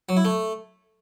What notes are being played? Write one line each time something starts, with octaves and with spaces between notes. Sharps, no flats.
F#3
E4
A3